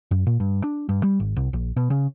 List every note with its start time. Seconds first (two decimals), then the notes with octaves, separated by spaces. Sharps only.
0.11 F#2
0.27 A#2
0.40 G2
0.64 D4
0.89 G2
1.03 G3
1.20 G#1
1.36 C2
1.53 A#1
1.77 B2
1.90 C#3